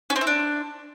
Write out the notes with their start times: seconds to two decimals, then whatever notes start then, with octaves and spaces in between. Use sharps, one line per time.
0.10 C#4
0.16 C4
0.21 E4
0.27 D4